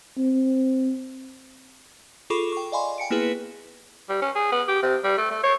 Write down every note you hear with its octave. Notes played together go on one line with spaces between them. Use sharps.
C4
F4 G#4 A4 B5 C#6 D6
G5 C#6
D5 D#5 F5 G#5 B5 C6
G5 G#5 C#7 D7
A#3 B3 E4 G#4 B4
G3
C#4
G#4
B3
G4
C3
G3
A3
A3
C#5